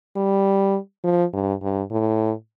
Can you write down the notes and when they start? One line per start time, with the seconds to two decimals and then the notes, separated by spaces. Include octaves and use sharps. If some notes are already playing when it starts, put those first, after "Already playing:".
0.16 G3
1.04 F3
1.33 G2
1.62 G2
1.91 A2